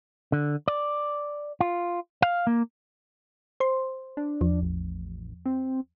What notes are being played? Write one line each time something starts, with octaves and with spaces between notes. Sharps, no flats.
D3
D5
F4
F5
A#3
C5 C6
D4
E2 F3
A1
C4